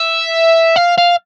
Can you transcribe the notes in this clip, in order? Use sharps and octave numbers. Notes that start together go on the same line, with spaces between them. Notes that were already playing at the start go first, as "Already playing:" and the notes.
Already playing: E5
F5
F5